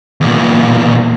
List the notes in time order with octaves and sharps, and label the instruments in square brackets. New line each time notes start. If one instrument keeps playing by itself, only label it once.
[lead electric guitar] E2 A#2